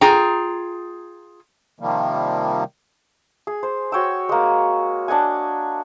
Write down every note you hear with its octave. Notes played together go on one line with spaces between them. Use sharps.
F4 G#4 G5 A#5
C3 D#3 F3 G3 A#3
G#4
C5
F#4 C#5 G5 E6
G#3 A#3
D4 D#5 F#5 G#5